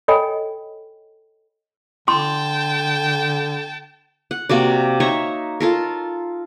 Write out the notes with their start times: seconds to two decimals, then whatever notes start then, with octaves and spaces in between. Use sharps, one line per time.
0.08 A4 C#5 D#5 G5 G#5 B5
2.08 D3 G5 A5 C6
4.31 F#5
4.49 C3 A#3 F#4 D5
5.00 D#4 C#5 E5 A#5
5.60 F4 A4 A#4